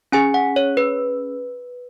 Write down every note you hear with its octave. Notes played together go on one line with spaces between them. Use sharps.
C#4 G#4 G#5
F#5
C#5
B4